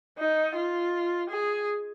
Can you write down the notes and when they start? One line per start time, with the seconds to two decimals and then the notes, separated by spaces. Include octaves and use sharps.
0.18 D#4
0.56 F4
1.30 G#4